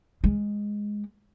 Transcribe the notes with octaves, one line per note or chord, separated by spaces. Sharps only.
G#3